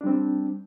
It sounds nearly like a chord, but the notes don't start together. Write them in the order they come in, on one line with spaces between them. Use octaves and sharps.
D4 G3 C4